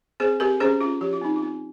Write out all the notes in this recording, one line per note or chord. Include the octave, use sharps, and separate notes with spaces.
C4 G#4 C5
C4 G4 A#4
C#4 G#4 C5
C#4 F4
F3 G4
F4
C4 D#4
F4
C4